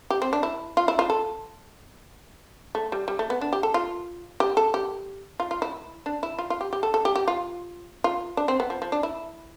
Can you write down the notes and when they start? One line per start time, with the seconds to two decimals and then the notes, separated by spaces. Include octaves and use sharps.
0.10 G4
0.22 C4
0.33 D4
0.43 E4
0.77 F4
0.88 E4
0.99 F4
1.10 A4
2.75 A3
2.92 G3
3.08 G3
3.19 A3
3.30 B3
3.41 D4
3.53 G4
3.63 A4
3.74 F4
4.40 G4
4.57 A4
4.74 G4
5.40 F4
5.51 F4
5.62 E4
6.06 D4
6.23 E4
6.39 F4
6.50 F4
6.61 G4
6.73 G4
6.83 A4
6.94 A4
7.05 G4
7.15 G4
7.28 F4
8.04 F4
8.37 D4
8.48 C4
8.60 B3
8.70 F3
8.82 F3
8.92 D4
9.03 E4